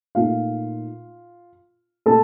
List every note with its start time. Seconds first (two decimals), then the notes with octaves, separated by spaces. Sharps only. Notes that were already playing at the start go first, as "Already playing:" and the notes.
0.15 A#2 A3 D#4 F4 F5
2.06 A#2 A3 A4 A5